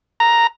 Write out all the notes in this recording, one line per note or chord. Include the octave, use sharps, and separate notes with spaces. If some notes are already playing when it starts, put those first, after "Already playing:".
A#5